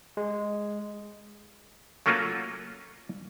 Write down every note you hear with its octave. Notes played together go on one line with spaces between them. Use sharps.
G#3
F#3 A3 A#3 C#4 F4 F#4